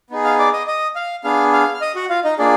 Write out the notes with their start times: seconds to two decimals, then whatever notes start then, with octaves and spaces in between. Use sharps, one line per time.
0.10 B3 D#4 G#4
0.24 F5 F6
0.39 D5 D6
0.53 D#5 D#6
0.67 D#5 D#6
0.96 F5 F6
1.24 B3 D4 G#4 F5 F6
1.53 F5 F6
1.74 F6
1.81 D#5 D#6
1.95 F#4 F#5
2.10 F4 F5
2.24 D#4 D#5
2.38 A#3 D4 F4 G#4 D5